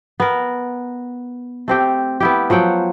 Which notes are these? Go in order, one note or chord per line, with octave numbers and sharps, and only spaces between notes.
B3 A#4
A3 C4 G4
B3 E4 G4
F3 F#3 F#5 G5